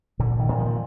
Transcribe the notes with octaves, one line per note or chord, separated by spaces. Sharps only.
A#2 D3
D#3
A#2
F3